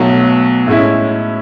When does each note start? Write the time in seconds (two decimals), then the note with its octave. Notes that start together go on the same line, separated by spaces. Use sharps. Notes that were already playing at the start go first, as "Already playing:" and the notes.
Already playing: B1 B2 F#3 A3
0.67 A2 G#3 C#4 E4